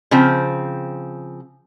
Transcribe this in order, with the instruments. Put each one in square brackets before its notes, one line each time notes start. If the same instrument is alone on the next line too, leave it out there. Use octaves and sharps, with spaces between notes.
[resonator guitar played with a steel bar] C#3 F3 C4